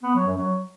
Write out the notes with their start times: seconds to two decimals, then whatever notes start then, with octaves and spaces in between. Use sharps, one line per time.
0.03 B3
0.15 F#3
0.26 F#2
0.38 F#3